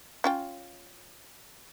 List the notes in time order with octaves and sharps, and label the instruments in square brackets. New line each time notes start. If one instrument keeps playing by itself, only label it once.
[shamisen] C#4 F4 G5